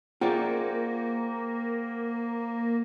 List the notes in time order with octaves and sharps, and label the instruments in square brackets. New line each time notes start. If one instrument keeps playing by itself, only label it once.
[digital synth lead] A#3 [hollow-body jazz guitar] F4 G#4 D5 [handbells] C5 F#5 G5